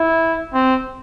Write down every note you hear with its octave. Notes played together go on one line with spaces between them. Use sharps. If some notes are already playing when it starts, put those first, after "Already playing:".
Already playing: E4
C4